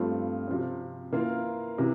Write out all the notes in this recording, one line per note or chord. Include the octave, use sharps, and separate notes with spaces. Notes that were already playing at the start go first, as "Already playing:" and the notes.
Already playing: G2 F3 A3 C4 F4
C3 F3 C4
E3 A#3 F4 A#4
C3 E3